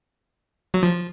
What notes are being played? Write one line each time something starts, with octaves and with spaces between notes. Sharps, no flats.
F#3
F3